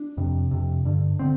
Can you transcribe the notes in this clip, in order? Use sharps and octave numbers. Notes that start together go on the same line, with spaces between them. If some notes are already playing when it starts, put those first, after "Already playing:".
Already playing: D4
F2 C3
F2 C3
G2 D3
D3 C4